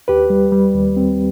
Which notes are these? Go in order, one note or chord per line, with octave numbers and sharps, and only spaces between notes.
D#2 G4 B4
G3
G3
D#2
C4